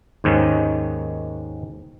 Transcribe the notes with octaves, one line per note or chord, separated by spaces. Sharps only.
D#2 G#2 D#3 C#4